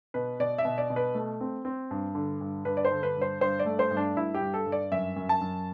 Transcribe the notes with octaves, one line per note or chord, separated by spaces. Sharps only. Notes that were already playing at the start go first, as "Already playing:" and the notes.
B2 B4
B2 D5
E5
B2
D5
B2
B4
A3
C4
C4
G2
D3
G2
G2 B4
D5
C5
D3
B4
G2
C5
G2 C5
D5
A3
C5
G2
D4
G2 E4
G4
G2
A4
G2
D5
F#2 E5
F#2
A5
F#2